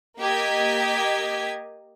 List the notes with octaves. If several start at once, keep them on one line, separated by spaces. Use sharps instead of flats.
A#3 G4 D#5 G#6 B6